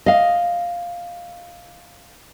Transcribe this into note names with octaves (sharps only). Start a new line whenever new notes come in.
D#5 F5